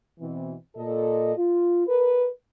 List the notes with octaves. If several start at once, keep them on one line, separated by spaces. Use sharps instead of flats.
B2 E3 C4
A#2 A4 D#5
F4
A#4 B4